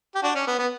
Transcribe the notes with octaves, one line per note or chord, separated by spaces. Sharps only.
G4
D4 F#4
C#4
B3
B3